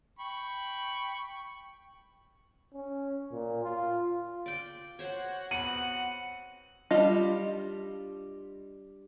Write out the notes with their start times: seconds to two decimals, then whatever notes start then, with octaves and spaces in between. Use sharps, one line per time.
0.19 G5 B5 C#6
2.74 C#4
3.32 A#2
3.63 F4
4.46 D5 G5
4.99 F#4 C5 C#5 F#5
5.51 B3 C4 C#7 D#7 F#7
6.91 G3 D4 F4 D#5 F5